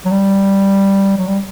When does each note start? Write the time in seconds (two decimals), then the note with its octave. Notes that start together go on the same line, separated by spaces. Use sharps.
0.06 F#3
0.12 G3
1.17 F#3
1.28 G3